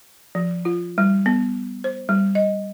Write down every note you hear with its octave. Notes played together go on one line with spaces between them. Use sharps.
F3
F4
G3
B3
C5
G3
D#5